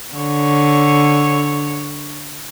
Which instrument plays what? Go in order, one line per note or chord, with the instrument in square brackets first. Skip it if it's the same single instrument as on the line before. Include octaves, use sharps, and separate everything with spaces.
[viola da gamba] D3 C#5